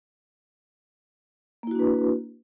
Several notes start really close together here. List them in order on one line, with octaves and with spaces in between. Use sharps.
A#3 E4 F#4 D4 B4